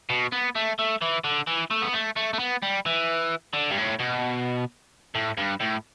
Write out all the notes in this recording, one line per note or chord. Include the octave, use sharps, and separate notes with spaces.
B2
B3
A3
A3
E3
D3
E3
A3
B3
A3
A3
A3
B3
G3
E3
D3
G2
A2
B2
A2
G2
A2